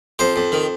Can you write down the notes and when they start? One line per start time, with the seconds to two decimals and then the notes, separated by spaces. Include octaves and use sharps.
0.19 F2 C5
0.36 F2
0.52 D#3